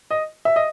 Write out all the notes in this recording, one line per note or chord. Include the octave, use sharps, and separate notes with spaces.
D#5
E5
D#5